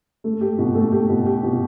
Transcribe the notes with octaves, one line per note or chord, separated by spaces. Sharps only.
A3
G4
B2
A3
G4
B2
G4
B2